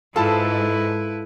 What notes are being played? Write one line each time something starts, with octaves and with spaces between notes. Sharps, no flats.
G#2 E4 F4 A4 B4 A5 B5